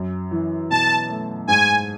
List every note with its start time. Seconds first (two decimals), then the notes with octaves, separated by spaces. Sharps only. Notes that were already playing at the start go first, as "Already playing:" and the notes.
Already playing: F#2
0.31 E3
0.70 B2 A5
1.09 A3
1.47 G#2 G#5